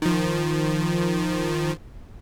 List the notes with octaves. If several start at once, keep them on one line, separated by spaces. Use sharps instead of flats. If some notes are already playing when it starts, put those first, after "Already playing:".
D#3 F3